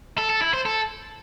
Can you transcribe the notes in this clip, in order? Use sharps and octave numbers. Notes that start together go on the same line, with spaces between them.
A4
A4
E4
C5
A4